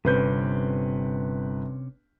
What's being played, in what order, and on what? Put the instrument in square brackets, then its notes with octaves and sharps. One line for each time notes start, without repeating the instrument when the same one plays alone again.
[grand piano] G1 B4 G6 [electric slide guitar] C3 C4 C#4